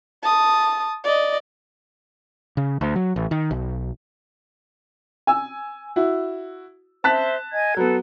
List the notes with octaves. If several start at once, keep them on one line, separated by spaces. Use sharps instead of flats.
A5 D#6
D5 D#5
C#3
D2
F#3
A1
D#3
B1
G#5 E6
E4 F#4
C5 E5 A5 F#6 B6
D#5 G#5 G#6
F#3 B3 A4 B4